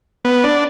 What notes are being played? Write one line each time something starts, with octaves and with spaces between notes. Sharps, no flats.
B3
D4